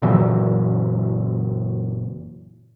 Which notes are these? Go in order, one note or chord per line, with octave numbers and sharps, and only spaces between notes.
F#1 A#2 E3 F#3